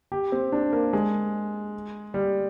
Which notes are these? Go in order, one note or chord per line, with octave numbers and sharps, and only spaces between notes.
G4
C4
D4
A#3
G#3
G3